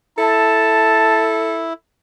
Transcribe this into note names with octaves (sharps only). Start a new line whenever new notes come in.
E4 A4 A5